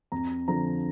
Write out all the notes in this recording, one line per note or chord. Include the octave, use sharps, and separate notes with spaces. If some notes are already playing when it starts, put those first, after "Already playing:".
F2 A#5
D3 F3 A#5